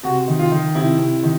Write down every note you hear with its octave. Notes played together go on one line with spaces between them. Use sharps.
C3 F#4
D#3
F4
D#3
C3 E4
C3
D#3